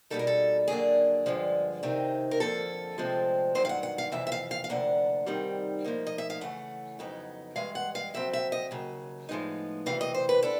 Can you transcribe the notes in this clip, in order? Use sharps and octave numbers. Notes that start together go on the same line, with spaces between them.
B2 G3 A#3 D#4 A4
A#4
A4
D#2 D3 F#3 A#3 D4 G#4
G2 D3 F3 G#3
C3 D#3 G#3 C4 D#4
A#4
F2 D3 F3 A#3 A4
D2 C3 F3 G#3 C4
G2 D#3 F#3 C5
F5
F#5
F#5
F5
F2 C3 E3 E5
E5
F5
F5
F5
D2 C3 F3 A#3 D4 F#5
C3 D#3 G3 C4 D#4
A2 F3 A#3 D#4
D#5
E5
F5
C#3 E3 A3 C#4 F#5
F2 C#3 F#3 B3 D#4
G2 E3 G#3 F5
F#5
F5
F2 C#3 F#3 C4 E5
E5
D#5
D#2 C#3 F#3
A2 F3 G#3 B3 D#4
D2 C3 E3 F5
D#5
C5
B4
B3 D4 A4